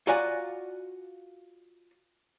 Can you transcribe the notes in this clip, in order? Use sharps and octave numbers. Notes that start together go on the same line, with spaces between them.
F4 F#4 D5 G#5 A#5